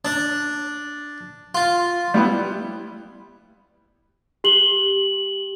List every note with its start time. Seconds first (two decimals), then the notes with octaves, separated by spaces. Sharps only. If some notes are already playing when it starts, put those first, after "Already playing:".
0.05 D4
1.55 F4
2.14 G3 B3 E4
4.44 G4 F#7 G7